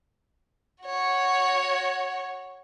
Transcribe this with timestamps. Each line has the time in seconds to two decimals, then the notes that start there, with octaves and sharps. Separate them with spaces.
0.84 F#4 C#5